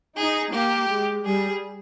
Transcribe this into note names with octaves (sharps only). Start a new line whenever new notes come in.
D#4 G#4
A#3 G4
G#3
G3 G#4